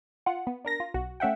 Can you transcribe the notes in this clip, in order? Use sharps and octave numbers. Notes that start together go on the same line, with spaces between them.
F4 F#5
B3
D4 A#4 A#6
F4
B1 F#4
A3 C#4 E5 F#5 G5